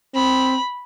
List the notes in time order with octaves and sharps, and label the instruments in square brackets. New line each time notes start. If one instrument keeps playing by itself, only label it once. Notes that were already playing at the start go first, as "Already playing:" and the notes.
[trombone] C4 [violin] B5